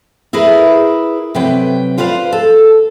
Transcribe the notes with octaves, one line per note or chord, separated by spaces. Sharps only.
E4 G#4 A#4 B4
C3 F#3 B4 G5
F4 B4 C5 D5 F5
A4